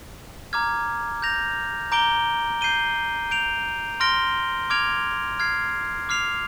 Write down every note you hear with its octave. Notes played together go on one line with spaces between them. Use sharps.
A#5 D6 F6 G#6
G6 A#6 F7
A#5 D6 G6 D7 G7
G6 C7 D#7 G7
G6 D7 F7
C6 F6 A#6 D7 G7
D6 F6 G#6 D7 F7
F6 G#6 C7
D6 F6 C7 F7